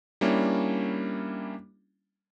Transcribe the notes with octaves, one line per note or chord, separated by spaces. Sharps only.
G3 A#3 C#4 D4 E4